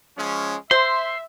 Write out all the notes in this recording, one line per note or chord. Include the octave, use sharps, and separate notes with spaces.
F3 G#3 C#4
C5 E5 C6